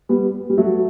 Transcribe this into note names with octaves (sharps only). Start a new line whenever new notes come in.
G3 B3
G3
F#3 A3